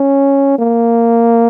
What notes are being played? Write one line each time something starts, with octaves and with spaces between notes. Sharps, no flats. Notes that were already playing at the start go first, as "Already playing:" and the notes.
Already playing: C#4
A#3